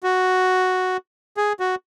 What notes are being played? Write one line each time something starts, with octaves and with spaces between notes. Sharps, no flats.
F#4
G#4
F#4